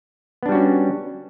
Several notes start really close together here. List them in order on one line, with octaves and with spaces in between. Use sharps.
B3 D4 G3 F#4 C#4